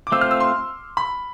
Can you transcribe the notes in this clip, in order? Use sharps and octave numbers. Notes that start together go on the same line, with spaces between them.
D6
A3 C4 F4 C5 E6
F6
E6
C6
B5